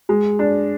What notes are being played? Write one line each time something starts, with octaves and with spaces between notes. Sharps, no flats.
G#3
D4